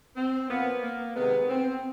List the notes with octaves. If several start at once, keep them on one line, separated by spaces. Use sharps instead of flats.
C4
A#2 F3 A#3 B3
A#3
C3 D#3 G#3 B3
C4